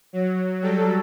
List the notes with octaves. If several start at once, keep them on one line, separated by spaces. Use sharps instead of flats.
F#3
F#3 G3 A4